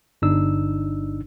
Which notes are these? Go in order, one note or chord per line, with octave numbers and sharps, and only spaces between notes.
G1 D4 D#4 E6